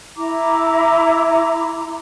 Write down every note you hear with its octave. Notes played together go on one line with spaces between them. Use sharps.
E4 A#5 D6